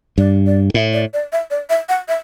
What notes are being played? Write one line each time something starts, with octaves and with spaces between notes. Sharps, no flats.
G2 D5
D5
A2 E5
D5
D5
E5
D5
E5
F#5
E5